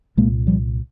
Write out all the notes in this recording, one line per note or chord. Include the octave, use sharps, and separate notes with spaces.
C2 A#2 G#3 A#3
F3 G3